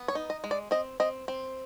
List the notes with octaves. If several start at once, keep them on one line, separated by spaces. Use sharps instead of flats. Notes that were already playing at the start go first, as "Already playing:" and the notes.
Already playing: B3
C#5
D#4
D#5
G#3
D5
C4 D#5
C4 D#5
C4